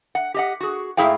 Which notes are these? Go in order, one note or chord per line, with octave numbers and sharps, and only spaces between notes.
F#5
G4 D#5 F#5
F#4 G#4
G#2 A3 E4 G#4 F5 G5